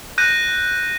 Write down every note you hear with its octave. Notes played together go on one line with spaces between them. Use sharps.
F#6 G6 A#6 D#7